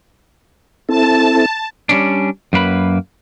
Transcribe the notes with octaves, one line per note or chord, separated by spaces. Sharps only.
C4 E4 A4 A5
G3 C#4 D4
F#2 A#3 B4 B5